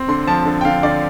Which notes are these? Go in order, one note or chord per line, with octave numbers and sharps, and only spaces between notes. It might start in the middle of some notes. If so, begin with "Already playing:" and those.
Already playing: C4
D3 C6
F3 A5
D3
G5
D3 F5
D3 D5